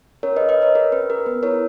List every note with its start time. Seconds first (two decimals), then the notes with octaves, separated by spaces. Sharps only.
0.23 C#4 A#4 C#5
0.36 B4 D#5
0.41 G#4
0.49 B4 D#5
0.58 G#4 A#4 C#5
0.75 G#4 A#4
0.92 C#4 B4
1.10 G#4 A#4
1.26 B3 B4
1.43 E4 A#4 C#5